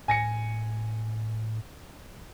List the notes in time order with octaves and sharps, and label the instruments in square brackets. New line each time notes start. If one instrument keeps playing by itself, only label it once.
[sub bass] A2 [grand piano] G#5 A#6 C#7